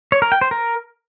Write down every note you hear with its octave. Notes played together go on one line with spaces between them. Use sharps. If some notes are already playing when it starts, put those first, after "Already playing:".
C#5
A#4
G5
C5
A#4